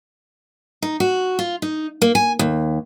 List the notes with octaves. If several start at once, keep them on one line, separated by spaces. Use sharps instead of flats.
D#4
F#4
F4
D#4
A#3
G#5
D#2